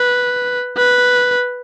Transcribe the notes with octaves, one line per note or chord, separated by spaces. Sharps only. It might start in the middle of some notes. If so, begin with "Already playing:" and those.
Already playing: B4
B4